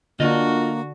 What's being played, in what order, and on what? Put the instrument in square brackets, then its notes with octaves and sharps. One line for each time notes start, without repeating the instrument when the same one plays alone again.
[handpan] D3 D4 [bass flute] A#3 [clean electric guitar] F4 D#5 [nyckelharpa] F#4